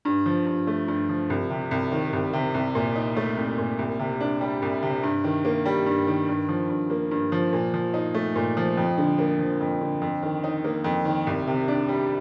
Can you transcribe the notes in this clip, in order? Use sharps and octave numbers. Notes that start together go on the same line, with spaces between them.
G2
F3
G2
A3
G2
F3
C2
C3
C2
D#3
C2
C3
C2
A#2
D#4
A3
C2
A#2
C2
C3
D4
G3
C2
C3
G2
D#3
A#3
G3
G2
D#3
G2
F3
G2
A#3
G2
F3
A#2
F3
D#4
A3
A#2
F3
F2
D3
A#3
F3
F2
D3
F2
D#3
D#4
A#3
F2
D#3
C2
C3
D4
G3